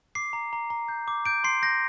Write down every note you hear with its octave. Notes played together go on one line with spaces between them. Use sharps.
D6 C7
A#5
A#5
A#5
G6
D6
G6 D7
C6 C7
G6 A#6